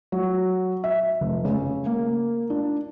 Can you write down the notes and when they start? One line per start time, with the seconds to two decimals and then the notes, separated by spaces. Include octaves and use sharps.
0.12 F#3
0.84 E5
1.21 F1
1.45 C#3
1.86 A#3
2.50 D4